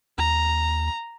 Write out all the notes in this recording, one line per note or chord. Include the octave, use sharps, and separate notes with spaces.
D#2 A#5